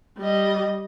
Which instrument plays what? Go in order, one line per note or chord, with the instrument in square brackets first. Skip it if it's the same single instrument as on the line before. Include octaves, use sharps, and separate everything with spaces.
[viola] G3 D#5